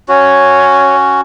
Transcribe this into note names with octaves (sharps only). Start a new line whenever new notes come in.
C#4 F#4 C#5